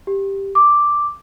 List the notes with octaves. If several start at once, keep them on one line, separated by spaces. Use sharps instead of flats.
G4
D6